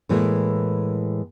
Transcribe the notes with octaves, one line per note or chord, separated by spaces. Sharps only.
A2 E3 G#3 A#3